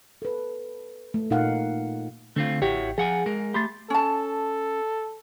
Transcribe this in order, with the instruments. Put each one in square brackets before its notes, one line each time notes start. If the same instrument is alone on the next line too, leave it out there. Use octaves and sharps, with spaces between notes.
[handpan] A4 B4
A3
A#2 D#4 A#4 F5 F#5
[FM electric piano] D3 [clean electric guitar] A3 C4 F4
[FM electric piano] A1 G4 G5 [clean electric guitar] E4 F#4 C#5
[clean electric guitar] F3 F#5 G#5 [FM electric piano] G#4
[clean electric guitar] G#3 A#4
[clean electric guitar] A3 G4 [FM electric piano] B5 C6 A6
[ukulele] C#4 A5 [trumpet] A4